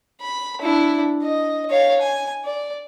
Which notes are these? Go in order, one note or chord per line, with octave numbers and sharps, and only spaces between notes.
B5
D4 E4
D#5
C#5 F5
G#5
D5